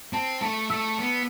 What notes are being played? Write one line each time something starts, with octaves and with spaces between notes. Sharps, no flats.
C4 A5
A3 A5
A3 E6
B3